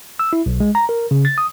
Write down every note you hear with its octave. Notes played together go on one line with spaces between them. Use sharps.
E6
E4
B1
G#3
A#5
A#4
C#3
A6
D#6